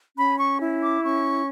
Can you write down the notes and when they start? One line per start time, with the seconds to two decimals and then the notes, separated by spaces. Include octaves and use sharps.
0.17 C#4 B5
0.38 C#6
0.60 E4
0.82 D6
1.03 C#4 C#6